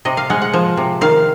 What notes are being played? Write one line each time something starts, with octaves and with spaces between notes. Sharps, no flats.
C3 D#5
F5
G#3 F#5
F#5
F3
C3
D#3 F5